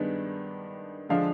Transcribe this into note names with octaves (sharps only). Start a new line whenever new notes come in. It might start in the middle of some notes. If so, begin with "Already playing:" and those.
Already playing: G2 D#3 G#3 B3 D4
D3 F3 G#3 D4 F5